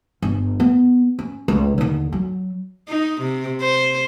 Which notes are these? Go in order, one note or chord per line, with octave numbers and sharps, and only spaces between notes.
G1
B3
C#4
C#2
D#2 D3
F#3
D#4
C3
C5